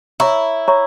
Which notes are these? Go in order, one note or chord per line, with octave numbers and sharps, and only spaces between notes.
E4 C#5 E5 A#5 C#6
C#5 E5 A#5 C#6